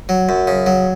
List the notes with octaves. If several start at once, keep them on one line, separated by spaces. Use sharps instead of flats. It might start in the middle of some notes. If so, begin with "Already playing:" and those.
F#3
F#2
C#3
F#3